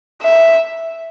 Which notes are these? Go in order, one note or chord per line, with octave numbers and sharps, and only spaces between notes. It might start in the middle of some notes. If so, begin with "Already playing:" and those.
E5